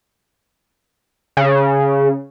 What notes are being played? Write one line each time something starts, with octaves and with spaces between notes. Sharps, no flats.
C#3